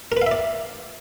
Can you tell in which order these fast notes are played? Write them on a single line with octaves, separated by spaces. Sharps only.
A#4 B4 F5 E5 D5